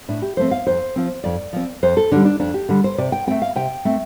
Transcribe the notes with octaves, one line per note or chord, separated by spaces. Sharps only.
A2 D4
G4
F3 A3 C4 C5
F5
F2 C5
F3 C4
F2 D5
F3 C4
F2 C5
A4
D3 G3 D4
D4
F2 D4
G4
D3 G3
C5
C3 D5
G5
A3 C4 G5
F5
C3 G5
A3 C4